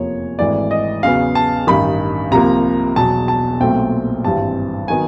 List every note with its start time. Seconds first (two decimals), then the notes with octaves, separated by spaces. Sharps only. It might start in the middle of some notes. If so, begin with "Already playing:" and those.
Already playing: F1 E2 C3 F3 A#3 C#5
0.39 G#1 G#2 E3 A3 D5
0.71 D#5
1.03 E2 C#3 F#3 B3 F5
1.35 A5
1.67 A1 G2 D#3 B5
2.31 C2 C3 F3 A#3 A#5
2.96 E1 E2 B2 F#3 A5
3.28 A5
3.60 B1 A#2 F#3 A3 C4 G5
4.24 G#1 G2 E3 G3 C4 A5
4.88 D#3 F#3 B3 G#5